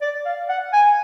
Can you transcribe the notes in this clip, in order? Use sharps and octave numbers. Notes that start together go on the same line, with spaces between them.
D5
F5
F#5
G#5